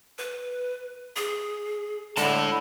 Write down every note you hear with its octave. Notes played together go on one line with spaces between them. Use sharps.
B4
G#4
D3 G#3 E4 A5